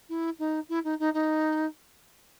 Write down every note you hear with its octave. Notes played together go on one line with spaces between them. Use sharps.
E4
D#4
E4
D#4
D#4
D#4